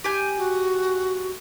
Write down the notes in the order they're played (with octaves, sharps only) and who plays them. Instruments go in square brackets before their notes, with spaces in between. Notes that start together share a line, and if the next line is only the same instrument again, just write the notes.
[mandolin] G4 G#5 G6
[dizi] F#4